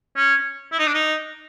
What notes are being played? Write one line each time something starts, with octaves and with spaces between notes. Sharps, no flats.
C#4
E4
D#4
D4
D#4